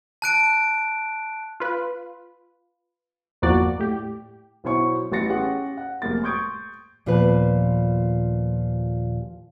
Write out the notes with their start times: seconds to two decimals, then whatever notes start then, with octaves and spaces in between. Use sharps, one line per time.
0.22 A5 F#6 D7
1.60 F4 B4
3.42 G1 E2 F3 A#3 F#4 D5
3.80 A2 G4
4.64 B1 B2 E4 C5 C#5 C#6
5.11 A1 B4 C6 A6 A#6 C#7
5.29 C#4 G4 G#4 F#5
5.77 F#5
6.02 F1 G#3 A#3 A6
6.23 C6 C#6 D#6 G6 G#6 D7
7.06 D#2 A#2 F3 B3 B4